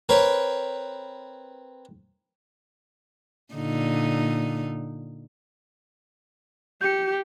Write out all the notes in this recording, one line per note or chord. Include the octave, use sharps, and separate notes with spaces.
C4 A#4 B4 C#5
A#2 D3 D#4
G4 G6 C#7